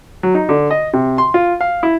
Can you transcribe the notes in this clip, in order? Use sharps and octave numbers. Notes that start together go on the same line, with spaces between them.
F#3
D#4
D3
D#5
C3
C6
F4
F5
E4